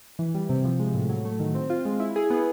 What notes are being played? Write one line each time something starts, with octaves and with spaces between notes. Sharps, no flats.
E3
G3
C3
F3
G#3
A2
F#3
A3
D#3
C4
F4
G#3
E4
G#4
B3